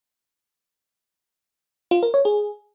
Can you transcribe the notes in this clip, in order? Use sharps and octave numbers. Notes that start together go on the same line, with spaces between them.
F4
A#4
C#5
G#4